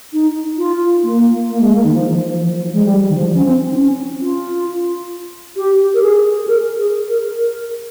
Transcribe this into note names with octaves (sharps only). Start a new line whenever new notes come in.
D#4
F4
A#3
A#3
G#3
A#3
D#3
F3
F3
F3
G#3
G3
D#3
F3
C#4
C4
D#4
C#4
F4
G4
A#4
G#4
G#4
A#4
G#4
A#4
A#4